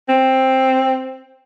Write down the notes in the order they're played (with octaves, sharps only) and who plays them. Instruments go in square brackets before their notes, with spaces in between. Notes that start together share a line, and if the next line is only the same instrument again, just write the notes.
[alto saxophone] C4